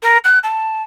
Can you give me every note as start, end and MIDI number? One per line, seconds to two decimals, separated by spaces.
0.03 0.18 70
0.24 0.39 90
0.43 0.82 81